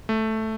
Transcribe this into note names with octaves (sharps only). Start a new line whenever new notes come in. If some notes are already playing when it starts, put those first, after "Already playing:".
A3